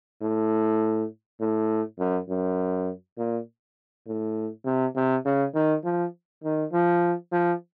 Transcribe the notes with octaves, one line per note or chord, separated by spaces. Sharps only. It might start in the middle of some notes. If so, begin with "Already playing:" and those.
A2
A2
F#2
F#2
A#2
A2
C3
C3
C#3
D#3
F3
D#3
F3
F3